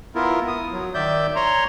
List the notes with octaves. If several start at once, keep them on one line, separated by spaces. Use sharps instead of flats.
B3 E4 F4 A#4
D#6
F#3
D#3 D5 E5 G6
C#5 A#5 C6